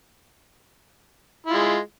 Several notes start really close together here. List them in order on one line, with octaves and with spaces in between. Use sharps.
E4 F4 G#3